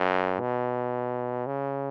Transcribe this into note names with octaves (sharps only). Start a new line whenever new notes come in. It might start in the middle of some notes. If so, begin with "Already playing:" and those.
Already playing: F#2
B2
C#3